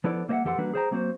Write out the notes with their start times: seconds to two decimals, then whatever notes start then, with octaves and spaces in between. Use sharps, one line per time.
0.04 F3 B3 E4 A4 D5
0.28 G3 A#3 C5 D#5 E5 F#5
0.44 F2 E3 G4 A4 F#5 C6
0.58 E3 G3 A#3 D4 F#4 B4
0.73 G#4 A#4 C5 D5 G5 A#5
0.91 F#3 A#3 C4 F#4 C5